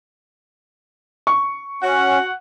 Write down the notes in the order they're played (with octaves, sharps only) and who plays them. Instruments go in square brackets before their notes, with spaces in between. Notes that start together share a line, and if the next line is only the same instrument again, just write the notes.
[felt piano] C#6
[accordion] C#4 [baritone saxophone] F#4 [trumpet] F#5